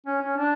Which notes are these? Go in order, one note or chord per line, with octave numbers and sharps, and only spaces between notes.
C#4
C#4
D4